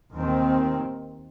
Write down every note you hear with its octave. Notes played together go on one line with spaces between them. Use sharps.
D#2 D#3 C4